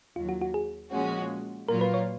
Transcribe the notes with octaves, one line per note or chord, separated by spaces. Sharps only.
D#2 D#3 F#3 F4
F#4
F#4
G#4
A#2 F3 G#3 C#4 F#4
A#2 F#3 A#3 F4 A#4
B4
C#5